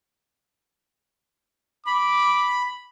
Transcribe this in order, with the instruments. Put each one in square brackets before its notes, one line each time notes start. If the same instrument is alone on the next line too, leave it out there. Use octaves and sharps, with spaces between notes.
[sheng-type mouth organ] B5 [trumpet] D6